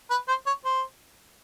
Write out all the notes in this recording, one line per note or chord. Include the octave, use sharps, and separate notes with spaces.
B4
C5
C#5
C5